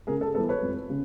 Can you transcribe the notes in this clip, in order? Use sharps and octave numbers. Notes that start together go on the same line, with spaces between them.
C#3 G#4 A#4
A4
E3 G3 B3 A4
B4 C#5
F2
C#3